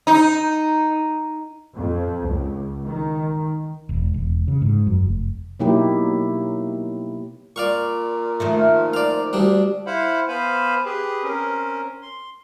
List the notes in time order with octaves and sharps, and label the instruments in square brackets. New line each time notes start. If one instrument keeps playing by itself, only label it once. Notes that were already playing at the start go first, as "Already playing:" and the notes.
[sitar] D#4
[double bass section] F2
C#2
D#3
[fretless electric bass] E1
E1
C#3
G#2
F#2
F1
[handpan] B2 F#3 A#3 D#4 E4 G4
[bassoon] A#2 [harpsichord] D5 F5 C#6
[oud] D#3 F3 A3
[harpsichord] D5 F5
D2 G3 D4
[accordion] E4 C5 F5 F#5 B5
B3 C5 F5 G#5 B5
G4 G#4 B4
C4 C#4 A#4
C6